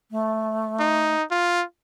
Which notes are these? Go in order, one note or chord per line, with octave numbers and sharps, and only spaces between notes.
A3
D#4
F4